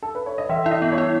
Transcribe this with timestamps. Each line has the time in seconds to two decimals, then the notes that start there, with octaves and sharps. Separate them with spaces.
0.02 A4
0.15 B4
0.26 C#5
0.38 D#5
0.49 E3 E5
0.64 E4 E5
0.71 D#5
0.82 B3
0.92 C#5
0.98 E4